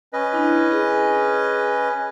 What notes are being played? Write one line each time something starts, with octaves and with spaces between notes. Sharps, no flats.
C#4 B4 D#5
D4 E4
G#4